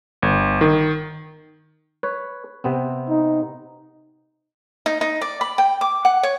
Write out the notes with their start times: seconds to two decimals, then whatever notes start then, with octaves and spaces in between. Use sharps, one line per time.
0.22 G1
0.61 D#3
2.03 B4 C#5
2.64 C3 B3 C4
3.09 D#4
4.86 D#4
5.01 D#4
5.21 D5
5.41 B5
5.58 G5
5.81 D6
6.05 F#5
6.23 C#5